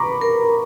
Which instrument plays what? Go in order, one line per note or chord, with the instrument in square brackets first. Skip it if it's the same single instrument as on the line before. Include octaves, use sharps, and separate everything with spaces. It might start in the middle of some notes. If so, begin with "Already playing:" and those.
Already playing: [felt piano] A#5 B5 C#6 D6
[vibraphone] A#4